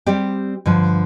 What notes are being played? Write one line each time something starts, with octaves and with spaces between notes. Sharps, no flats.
G3 C4 G4 D5
G2 D3 F3